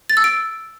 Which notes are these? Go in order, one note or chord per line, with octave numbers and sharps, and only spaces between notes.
A6
E6
D7